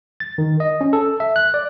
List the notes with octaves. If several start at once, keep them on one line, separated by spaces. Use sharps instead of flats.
A6
D#3
D#5
C#4
A4
E5
F#6
D5